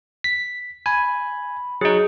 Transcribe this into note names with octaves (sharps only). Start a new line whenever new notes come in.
B6
G#5 B5
F#3 D#4 G#4